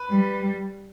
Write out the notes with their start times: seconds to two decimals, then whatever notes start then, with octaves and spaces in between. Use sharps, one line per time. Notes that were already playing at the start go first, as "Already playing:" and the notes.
Already playing: B4
0.10 G3